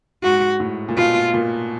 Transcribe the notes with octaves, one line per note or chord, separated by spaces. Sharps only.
G#2 F#4
A2
A#2
B2 F4
A#2